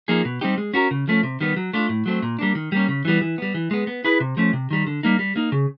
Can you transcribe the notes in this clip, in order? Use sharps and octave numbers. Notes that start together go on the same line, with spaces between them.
F3 A#3 D#4 G#4
B2
G3 C4 D#4 G4
G#3
C#4 F#4 A#4
C#3
F3 A3 C#4
C3
D#3 G3 B3
F#3
A3 D4 F4
A2
F#3 A3 C4
A#2
G3 A#3 D4
D#3
G3 A#3 C#4
C#3
E3 G3 B3
E3
G3 B3
E3
G#3 B3
B3
E4 G#4 B4
C3
F3 A3 C#4
C3
D#3 G3
D3
G3 A#3 D#4
G3
A#3 D#4
C#3